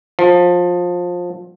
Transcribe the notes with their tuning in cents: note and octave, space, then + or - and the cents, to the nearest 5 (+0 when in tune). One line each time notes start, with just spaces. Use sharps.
F3 +20